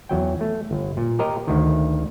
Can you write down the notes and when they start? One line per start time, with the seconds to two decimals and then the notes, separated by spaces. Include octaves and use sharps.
0.09 E2 F#3 G5
0.41 A3
0.71 G1
0.97 A#2
1.19 G4 A#4 D#5
1.47 D2 D#3